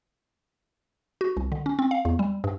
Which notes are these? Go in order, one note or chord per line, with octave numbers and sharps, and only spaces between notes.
F#4
C2
D3
C#4
C4
F5
E2
G3
G2